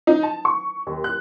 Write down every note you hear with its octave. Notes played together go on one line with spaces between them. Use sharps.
D#4
A5
C#6
D#2
F#6